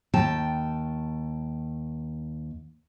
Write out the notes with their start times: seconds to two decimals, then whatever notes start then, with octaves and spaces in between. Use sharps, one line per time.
0.14 D#2 G5 A5